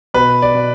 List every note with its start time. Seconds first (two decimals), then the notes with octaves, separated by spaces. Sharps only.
0.14 B2 B4
0.42 D5
0.55 B2